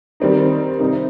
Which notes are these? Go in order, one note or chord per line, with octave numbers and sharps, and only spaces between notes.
D#3 G3 C4 D#4
C3 G3 C4 D#4